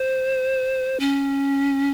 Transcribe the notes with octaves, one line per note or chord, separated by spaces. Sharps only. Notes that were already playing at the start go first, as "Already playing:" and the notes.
Already playing: C5
C#4